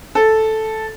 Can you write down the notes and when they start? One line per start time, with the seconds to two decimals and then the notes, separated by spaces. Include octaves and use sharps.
0.15 A4